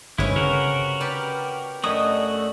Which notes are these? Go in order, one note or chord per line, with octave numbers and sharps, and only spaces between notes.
G1 C3 G#3 C#4 E4 B4
C#3 F#4 A#4
G4 B4 D5
F#2 A3 D4 F#4 D#5 G#5 D#6